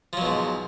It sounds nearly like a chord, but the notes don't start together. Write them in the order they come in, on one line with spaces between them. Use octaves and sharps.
F3 F#3 B2 G#2